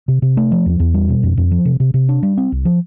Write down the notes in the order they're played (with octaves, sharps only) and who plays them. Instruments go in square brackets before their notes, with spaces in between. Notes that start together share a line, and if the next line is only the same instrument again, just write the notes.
[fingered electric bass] C3
C3
A3
F3
E2
E2
G3
B2
F2
F2
F3
C3
C3
C3
D4
G3
C4
C2
F3